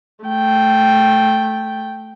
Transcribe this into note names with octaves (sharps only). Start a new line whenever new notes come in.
A3 G5